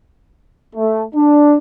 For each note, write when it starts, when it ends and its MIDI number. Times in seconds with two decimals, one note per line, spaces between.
0.75 1.03 57
1.15 1.57 62